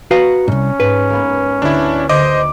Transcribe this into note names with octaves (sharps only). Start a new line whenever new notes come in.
F#4 B4 F5 A#5 C#6
C2 G#2 C#4
G#2 B4
A#3 B3
D2 D4 E4
D3 C5 D#5 D6